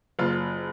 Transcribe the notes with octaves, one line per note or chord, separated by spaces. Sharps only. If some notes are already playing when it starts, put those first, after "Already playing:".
F#1 F4